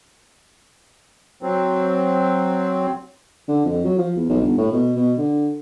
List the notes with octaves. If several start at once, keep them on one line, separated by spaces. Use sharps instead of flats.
F#3 C4
D3
F2
F#3
F3
E2
B1
G1
A2
B2
B2
D3